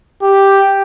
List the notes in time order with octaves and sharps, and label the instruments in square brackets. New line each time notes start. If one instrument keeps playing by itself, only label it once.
[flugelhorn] G4